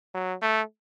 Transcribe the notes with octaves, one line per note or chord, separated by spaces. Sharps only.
F#3
A3